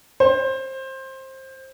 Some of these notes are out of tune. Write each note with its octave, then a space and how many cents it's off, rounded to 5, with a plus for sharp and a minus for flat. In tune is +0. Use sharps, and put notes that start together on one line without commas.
C5 +20